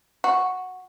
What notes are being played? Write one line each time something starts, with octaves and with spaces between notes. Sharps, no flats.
F#4